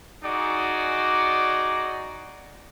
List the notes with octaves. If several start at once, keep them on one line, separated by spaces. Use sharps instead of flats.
D#4 F#4 G#4 D5